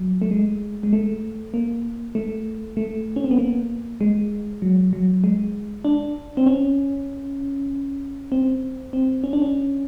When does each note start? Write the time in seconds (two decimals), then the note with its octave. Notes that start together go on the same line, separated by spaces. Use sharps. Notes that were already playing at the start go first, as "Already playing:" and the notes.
Already playing: F#3
0.22 A3
0.31 G#3
0.83 G#3
0.93 A3
1.54 A#3
2.15 A3
2.77 A3
3.16 C#4
3.24 C4
3.31 B3
3.39 A#3
4.01 G#3
4.62 F#3
4.93 F#3
5.24 G#3
5.85 D4
6.37 C4
6.46 C#4
8.32 C4
8.93 C4
9.24 C#4
9.33 D4
9.42 C#4